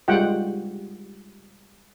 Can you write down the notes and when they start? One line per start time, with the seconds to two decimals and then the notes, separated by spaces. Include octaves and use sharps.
0.08 G3 G#3 F4 F#5 G5